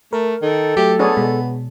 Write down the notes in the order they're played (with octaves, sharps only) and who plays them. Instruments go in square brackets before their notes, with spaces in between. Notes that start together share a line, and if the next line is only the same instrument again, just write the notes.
[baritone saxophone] A3 [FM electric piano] A#4
[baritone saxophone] D#3 [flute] A4
[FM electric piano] F#3 A3 [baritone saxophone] G4
[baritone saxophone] B3 [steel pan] D4 G#4 C#5
[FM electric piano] B2 [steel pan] G#3